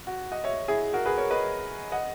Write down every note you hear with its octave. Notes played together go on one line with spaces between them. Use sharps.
F#4
D#5 F#5
C#5 E5
E4 G#4
F#4 A#4
G#4 B4
A#4 C#5
B4 D#5
D#5 F#5